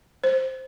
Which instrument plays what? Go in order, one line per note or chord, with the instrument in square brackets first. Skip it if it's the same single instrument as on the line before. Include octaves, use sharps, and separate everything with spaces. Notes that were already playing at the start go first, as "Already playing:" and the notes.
[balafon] C5